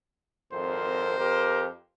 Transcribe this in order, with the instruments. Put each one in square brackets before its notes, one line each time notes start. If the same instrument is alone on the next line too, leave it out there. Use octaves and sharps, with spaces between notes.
[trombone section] G#1 F2 A#4 [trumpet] C5
[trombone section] F2 G4 A#4